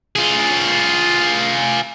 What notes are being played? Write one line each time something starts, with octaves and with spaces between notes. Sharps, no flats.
F4 G#4